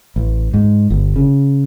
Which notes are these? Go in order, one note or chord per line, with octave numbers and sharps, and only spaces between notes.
A1
G#2
G1
C#3